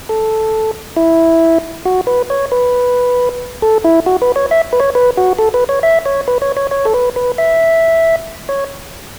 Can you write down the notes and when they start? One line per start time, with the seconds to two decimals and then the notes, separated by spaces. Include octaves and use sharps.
0.09 A4
0.96 E4
1.86 F#4
2.07 B4
2.30 C#5
2.52 B4
3.62 A4
3.84 E4
4.06 F#4
4.22 B4
4.36 C#5
4.51 E5
4.73 B4
4.80 C#5
4.95 B4
5.17 F#4
5.39 A4
5.54 B4
5.69 C#5
5.83 E5
6.06 C#5
6.28 B4
6.42 C#5
6.57 C#5
6.71 C#5
6.85 A4
6.94 B4
7.16 B4
7.38 E5
8.49 C#5